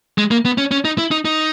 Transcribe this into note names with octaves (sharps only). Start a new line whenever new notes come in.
G#3
A#3
B3
C#4
C#4
D#4
E4
D#4
D#4